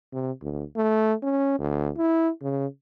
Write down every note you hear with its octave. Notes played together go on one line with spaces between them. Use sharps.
C3
D2
A3
C#4
D2
E4
C#3